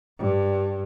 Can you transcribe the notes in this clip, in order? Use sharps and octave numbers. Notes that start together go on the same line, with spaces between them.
G2